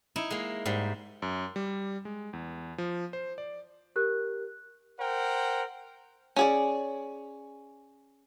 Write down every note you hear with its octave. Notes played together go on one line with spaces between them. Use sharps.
D#4 E4
G#3 A#3
G#2 G3
F#2
G3
G#3
E2
F3
C5
D5
G4 A#4 F#6
A#4 C5 F#5 G5
C#4 G#4 D5